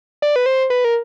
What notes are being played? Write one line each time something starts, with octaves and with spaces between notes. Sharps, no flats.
D5
B4
C5
B4
A#4